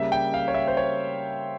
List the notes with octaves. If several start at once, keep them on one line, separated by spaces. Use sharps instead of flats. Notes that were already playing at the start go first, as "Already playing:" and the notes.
Already playing: C#3 G3 A#3 E5
G5
F5
C#5
E5
C5
C#5